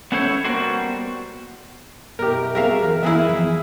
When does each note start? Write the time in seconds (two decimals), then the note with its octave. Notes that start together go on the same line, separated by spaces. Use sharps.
0.12 B3 C#4 E4 A4 C5 C#5
0.45 G3 A#3 B3 F#4 C5
2.19 B2 E4 G4 A#4
2.55 C4 F#4 G#4 A#4 E5 F5
2.83 E3 A#4
3.03 E3 B3 E4 G#4 E5
3.29 F3